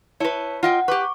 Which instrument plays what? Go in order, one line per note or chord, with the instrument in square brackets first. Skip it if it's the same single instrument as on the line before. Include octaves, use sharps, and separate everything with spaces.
[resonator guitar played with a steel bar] E4 B4 [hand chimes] C#5 A5 C#7
[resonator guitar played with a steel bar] F4 D#5 G5 [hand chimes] F#5
[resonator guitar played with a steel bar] G4 B4 [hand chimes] C#6 D6